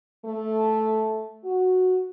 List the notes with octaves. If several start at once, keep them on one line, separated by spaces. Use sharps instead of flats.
A3
F#4